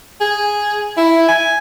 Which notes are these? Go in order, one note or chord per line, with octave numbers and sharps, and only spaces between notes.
G#4
E4
G#5